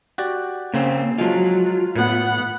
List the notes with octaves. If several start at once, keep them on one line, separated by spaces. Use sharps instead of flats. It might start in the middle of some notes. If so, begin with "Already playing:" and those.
F#4 G4 D5
C#3 A#3 C4 C#4 C5
F3 F#3 G#3 F4
A2 B3 F#5